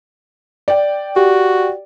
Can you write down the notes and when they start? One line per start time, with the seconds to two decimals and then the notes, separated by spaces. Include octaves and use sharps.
0.68 D5 G5
1.16 F#4 G4